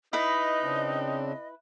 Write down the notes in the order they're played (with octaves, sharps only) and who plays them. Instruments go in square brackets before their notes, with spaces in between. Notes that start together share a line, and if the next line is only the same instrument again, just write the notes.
[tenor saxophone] D#4 [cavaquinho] E4 B4 [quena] D#5
[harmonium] C#3 C4 D4